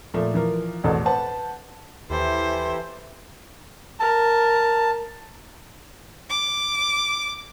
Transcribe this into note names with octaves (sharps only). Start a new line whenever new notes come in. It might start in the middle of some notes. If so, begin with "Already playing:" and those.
A#2 F3 A3
E3 F3 A#4
A1 E2 B2 A4
B4 C5 F#5 A5
D#2 E3 E4 G4 A4 C5
A#4 A5
D6